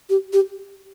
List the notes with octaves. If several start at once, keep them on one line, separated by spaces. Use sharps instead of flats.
G4
G4